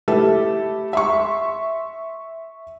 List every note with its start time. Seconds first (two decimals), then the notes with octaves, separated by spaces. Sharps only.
0.08 A3 E4 G4 A4
0.93 E5 C6 C#6